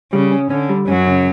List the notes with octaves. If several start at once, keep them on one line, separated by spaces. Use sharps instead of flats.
C#3 G3
C#4
D3 C#4
G3
F#2 F#3 C#4
C#3